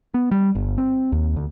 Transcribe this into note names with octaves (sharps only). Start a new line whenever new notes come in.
B3
G3
G1
C4
D#2
D2